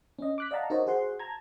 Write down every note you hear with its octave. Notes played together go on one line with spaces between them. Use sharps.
C#4 D#5
D6 F#6 B6
D5 D#5 F5 F#5 A5 A#5
D#4 F#4 A#4 C5 C#5 D#5
F#4 G#4 C5 F#5 C6
A5 A#5 G#6